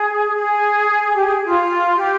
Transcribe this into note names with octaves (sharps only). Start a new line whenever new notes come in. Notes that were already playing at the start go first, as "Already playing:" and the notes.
Already playing: G#4
G#4
G4
G#4
F4
G4